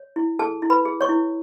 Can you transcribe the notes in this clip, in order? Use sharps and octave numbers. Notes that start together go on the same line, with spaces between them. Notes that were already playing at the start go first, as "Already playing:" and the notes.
Already playing: C#5
E4
G#4 A4 A5
E4
B4 B5
G#4
C#5 C#6
E4